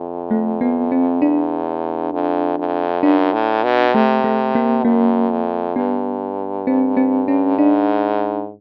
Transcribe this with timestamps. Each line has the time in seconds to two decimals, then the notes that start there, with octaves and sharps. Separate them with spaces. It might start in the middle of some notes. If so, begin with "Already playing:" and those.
Already playing: F2
0.31 A3
0.61 B3
0.92 C4
1.21 E2 D4
2.13 F2
2.59 F2
3.03 F#2 D4
3.33 A2
3.64 B2
3.94 C3 A3
4.24 A3
4.55 A#3
4.85 F#2 A#3
5.30 F2
5.75 G2 B3
6.67 C4
6.97 C4
7.28 C#4
7.58 G#2 D4